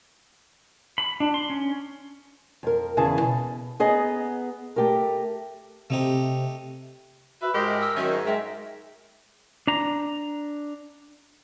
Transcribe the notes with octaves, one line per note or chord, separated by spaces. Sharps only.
B5
D4
C6
C#4
F2 A#4
E2 C#3 E4 G#4 A5
B2
B3 G#4 D#5 A#5
A3 G4 A#4
C3 A3 D#4 G4
F#4 B4 E5
G#2 G#3 G4 A#4 D#5
E6
D#3 F#3 C#4 E5
G#2
G#3 A#4 E5 G5
D4 A#5